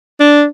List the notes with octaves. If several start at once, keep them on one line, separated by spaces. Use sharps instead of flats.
D4